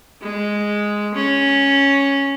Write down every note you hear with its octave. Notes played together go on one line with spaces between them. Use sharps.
G#3
C#4